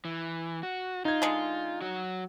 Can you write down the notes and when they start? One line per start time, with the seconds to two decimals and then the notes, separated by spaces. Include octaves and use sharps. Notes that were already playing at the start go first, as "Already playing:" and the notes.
0.05 E3
0.63 F#4
1.05 D#4 F4 G#6
1.22 D3 G#3
1.82 F#3 F#4